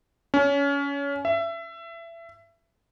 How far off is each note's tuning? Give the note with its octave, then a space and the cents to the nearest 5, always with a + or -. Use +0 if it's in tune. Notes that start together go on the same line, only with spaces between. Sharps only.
C#4 +25
E5 +25